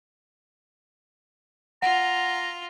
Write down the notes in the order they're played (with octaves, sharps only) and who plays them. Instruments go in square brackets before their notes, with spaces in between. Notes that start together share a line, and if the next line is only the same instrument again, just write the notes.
[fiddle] F4 [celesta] F#5 [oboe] A#5